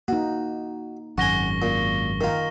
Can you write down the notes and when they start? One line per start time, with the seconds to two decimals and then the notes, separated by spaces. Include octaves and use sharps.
0.08 A#3 D#4 F#4
1.18 G#1 F#2 F#5 G#5 C#6 A#6 G7
1.62 A#2
2.21 D#3 F4 A#4